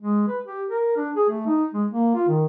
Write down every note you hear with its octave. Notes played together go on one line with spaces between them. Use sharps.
G#3
B4
G4
A#4
D4
G#4
A3
D#4
G#3
A#3
F4
D#3